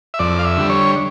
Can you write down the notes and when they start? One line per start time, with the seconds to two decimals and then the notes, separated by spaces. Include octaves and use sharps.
0.14 E5
0.19 F2 D5
0.39 F5
0.45 E5
0.57 D3 G3
0.70 C#5